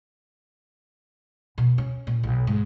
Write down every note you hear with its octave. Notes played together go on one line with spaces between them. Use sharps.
B2
C#4
A#2
B1
G#2